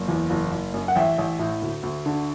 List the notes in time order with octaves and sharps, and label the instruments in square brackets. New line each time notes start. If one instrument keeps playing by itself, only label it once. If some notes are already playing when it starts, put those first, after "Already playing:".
Already playing: [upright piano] F#1
E2
F#1
F#1
F#2
F#5
A1 E5 G5
A1
A2
D2
D2
D3